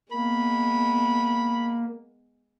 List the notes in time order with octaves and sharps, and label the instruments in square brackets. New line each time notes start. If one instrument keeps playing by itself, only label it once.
[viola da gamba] G#3 B3 [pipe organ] A#3 [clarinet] B5